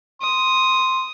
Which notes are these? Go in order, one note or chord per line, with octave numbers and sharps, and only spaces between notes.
C6 D#6